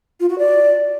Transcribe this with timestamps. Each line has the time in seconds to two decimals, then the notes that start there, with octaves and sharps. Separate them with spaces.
0.20 F4
0.29 F#4
0.38 D5